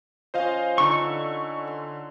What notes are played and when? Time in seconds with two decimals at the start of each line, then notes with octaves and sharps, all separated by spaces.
0.34 F3 C#4 C5 D#5 F5
0.78 D3 D#4 A4 C#6 E6
1.67 C6